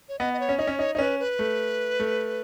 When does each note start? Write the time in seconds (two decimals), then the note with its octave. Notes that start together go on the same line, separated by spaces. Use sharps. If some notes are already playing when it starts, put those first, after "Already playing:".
0.09 C#5
0.19 B3 D#5
0.33 D#5
0.40 C#5
0.49 C#4
0.59 D#4 C#5
0.67 C#4
0.79 D#4 C#5
0.95 D#4 C#5
0.98 C#4 B4
1.20 B4
1.39 A3
2.00 A3